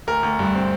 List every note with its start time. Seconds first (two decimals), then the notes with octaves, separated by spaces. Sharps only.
0.07 D2 A#4
0.23 D2
0.39 G2
0.55 C4